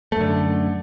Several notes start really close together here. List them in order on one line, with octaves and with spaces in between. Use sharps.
A3 F#2 D3